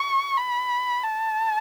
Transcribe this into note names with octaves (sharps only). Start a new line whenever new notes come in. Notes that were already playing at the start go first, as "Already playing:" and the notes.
Already playing: C#6
B5
A5